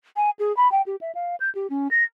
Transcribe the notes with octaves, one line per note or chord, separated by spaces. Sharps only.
G#5
G#4
B5
G5
G4
E5
F5
G6
G4
C#4
A#6